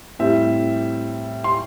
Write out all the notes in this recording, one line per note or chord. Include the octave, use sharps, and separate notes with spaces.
A2 G3 C4 E5
C6